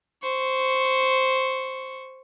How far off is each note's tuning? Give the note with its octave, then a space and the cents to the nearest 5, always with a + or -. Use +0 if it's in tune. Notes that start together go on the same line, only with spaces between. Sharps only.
C5 +0 C#6 +0